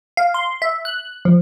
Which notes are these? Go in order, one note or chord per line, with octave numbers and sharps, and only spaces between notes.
F5
C6
E5
F#6
F3